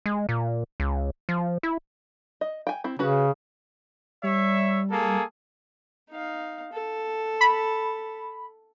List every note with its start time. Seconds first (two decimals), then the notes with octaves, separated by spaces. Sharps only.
0.06 G#3
0.29 A#2
0.80 C#2
1.29 F3
1.63 E4
2.41 D#5
2.67 G5 G#5
2.84 C4 E4
2.99 C#3 C#4 F#4 B4
4.23 G3 C#5 E5
4.91 A#3 G#4 A4
6.10 D#4 F5
6.73 A4
7.41 B5